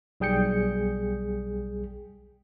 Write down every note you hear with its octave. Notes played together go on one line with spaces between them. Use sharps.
B1 G3 G#4 G5 G6 C#7